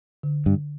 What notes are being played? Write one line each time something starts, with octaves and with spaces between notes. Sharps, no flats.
D3
G2